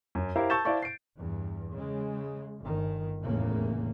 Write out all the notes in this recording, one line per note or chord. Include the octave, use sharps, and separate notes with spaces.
F#2
E4 G4 A#4 C5 F5
A5 C#6 E6 G6 A6 E7
E4 C5 D5 F5 A5 C#6
C7 D7
E2 G2
C#3 G#3
G1 D#3
F1 E2 A2 C#3 A#3